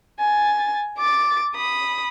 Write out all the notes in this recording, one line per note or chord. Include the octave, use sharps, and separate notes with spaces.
G#5 A6
D6 A6
B5 D#6